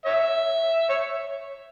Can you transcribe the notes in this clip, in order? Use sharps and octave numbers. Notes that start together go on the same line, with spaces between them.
C#5 E5
C#5